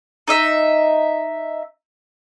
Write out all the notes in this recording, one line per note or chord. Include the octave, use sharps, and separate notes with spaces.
D#4 D#5 E5